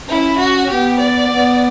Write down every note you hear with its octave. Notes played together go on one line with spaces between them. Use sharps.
C#4 E4
F#4
B3 G4
D5
B3